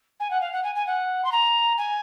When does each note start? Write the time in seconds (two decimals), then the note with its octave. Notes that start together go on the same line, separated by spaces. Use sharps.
0.20 G#5
0.30 F#5
0.41 F5
0.53 F#5
0.63 G#5
0.75 G#5
0.86 F#5
1.24 C6
1.32 A#5
1.77 G#5